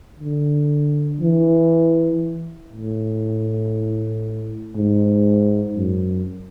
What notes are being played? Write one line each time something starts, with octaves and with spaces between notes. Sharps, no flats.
D3
E3
A2
G#2
F#2